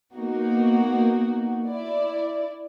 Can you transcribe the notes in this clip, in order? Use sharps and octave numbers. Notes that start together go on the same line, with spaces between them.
A#3 B3 D#4 F#4
E4 D5